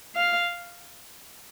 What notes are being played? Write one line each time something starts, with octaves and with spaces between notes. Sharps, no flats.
F5